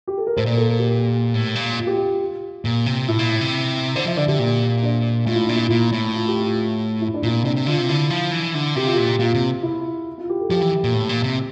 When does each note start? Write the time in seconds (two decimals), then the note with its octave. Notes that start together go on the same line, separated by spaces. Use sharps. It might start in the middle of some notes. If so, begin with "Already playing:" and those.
0.07 G4
0.18 A4
0.27 A#4
0.36 A2 C5
0.45 A#2 D5
0.57 A4
0.67 A#4
0.79 G4
1.34 A2
1.55 A#2
1.77 F4
1.87 G4
1.97 F4
2.65 A#2
2.86 C3
3.08 A2 E4
3.19 A#2
3.30 A2
3.41 C3
3.96 D3 C5
4.06 F3 E5
4.17 D3 D5
4.28 D3 G4
4.39 A#2
4.83 D4
5.26 A2 F4
5.36 E4
5.46 A#2 D4
5.56 E4
5.63 F4
5.70 A#2 E4
5.92 A2
6.14 F4
6.28 G4
6.41 F4
7.01 E4
7.14 D4
7.23 A#2 E4
7.44 C3 D4
7.56 C3
7.66 D3 F4
7.78 C3
7.89 D3 E4
8.10 F3
8.32 E3
8.55 D3
8.75 C3 G4
8.85 F4
8.95 A#2 G4
9.19 A#2 F4
9.34 C3
9.63 E4
10.18 F4
10.29 G4
10.40 A4
10.50 F3 G4
10.62 E3
10.84 A#2
10.94 A2
11.09 A#2
11.23 C3